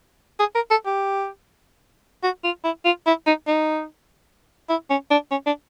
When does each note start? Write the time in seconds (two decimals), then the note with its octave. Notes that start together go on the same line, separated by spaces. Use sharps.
0.40 G#4
0.55 A#4
0.71 A4
0.86 G4
2.24 F#4
2.44 F4
2.64 E4
2.85 F4
3.06 E4
3.27 D#4
3.47 D#4
4.69 E4
4.90 C#4
5.11 D4
5.31 C#4
5.46 D4